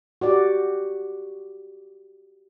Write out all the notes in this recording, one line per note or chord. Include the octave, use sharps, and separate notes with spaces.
F#4 G4 D5